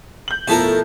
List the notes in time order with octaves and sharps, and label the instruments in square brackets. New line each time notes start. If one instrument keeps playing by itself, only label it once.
[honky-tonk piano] G6 F#7
[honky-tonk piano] B2 F3 A3 [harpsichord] E4 A4 A#4